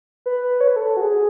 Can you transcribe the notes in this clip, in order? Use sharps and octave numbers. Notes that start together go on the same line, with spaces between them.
B4
C#5
B4
A4
F#4
G#4